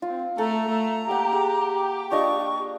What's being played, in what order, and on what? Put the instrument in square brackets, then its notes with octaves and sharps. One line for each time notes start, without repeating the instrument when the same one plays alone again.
[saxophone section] C4 [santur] F4
[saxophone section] A3 [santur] A4 [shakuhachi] A#5
[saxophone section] A3
[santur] A#3 F#5 [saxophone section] G4
[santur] G#4
[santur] D4 F4 D#5 [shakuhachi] C#6